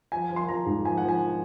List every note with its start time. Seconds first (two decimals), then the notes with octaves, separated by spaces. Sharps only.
0.12 F3 G#5
0.30 F3
0.36 C6
0.49 F3 A#5
0.66 G#2
0.85 F3 G#5
0.98 F#5
1.04 F3
1.09 G#5